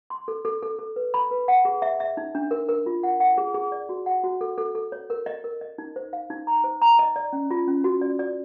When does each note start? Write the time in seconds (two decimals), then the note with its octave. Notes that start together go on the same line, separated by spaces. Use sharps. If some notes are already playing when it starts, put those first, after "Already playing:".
0.10 C6
0.28 A4
0.45 A4
0.62 A4
0.79 A4
0.96 B4
1.14 B5
1.31 B4
1.48 F#5
1.65 G#4
1.82 E5
2.00 E5
2.17 D#4
2.35 D4
2.51 A#4
2.69 A#4
2.86 F4
3.03 F#5
3.20 F#5
3.38 G#4
3.54 G#4
3.72 D5
3.89 F#4
4.06 F#5
4.24 F#4
4.41 A4
4.58 A4
4.75 A4
4.92 C#5
5.10 A#4
5.26 D#5
5.44 A#4
5.61 D#5
5.78 D#4
5.96 C5
6.13 F5
6.30 D#4
6.47 A#5
6.64 C5
6.82 A#5
6.99 D#5
7.16 D5
7.33 C#4
7.51 F4
7.68 C#4
7.84 F#4
8.01 D5
8.19 D5